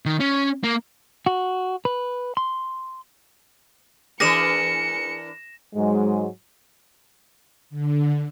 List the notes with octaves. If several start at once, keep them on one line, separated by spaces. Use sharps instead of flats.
D#3
C#4
A#3
F#4
B4
C6
E3 D4 G#4 A#4 D6 A#6 C#7 E7
G#2 F#3 G#3
D3